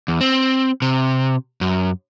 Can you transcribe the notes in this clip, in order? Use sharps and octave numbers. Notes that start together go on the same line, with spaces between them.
E2
C4
C3
F#2